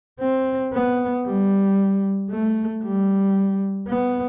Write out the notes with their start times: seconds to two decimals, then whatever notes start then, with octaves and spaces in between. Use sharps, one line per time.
0.21 C4
0.73 B3
1.26 G3
2.30 A3
2.83 G3
3.88 B3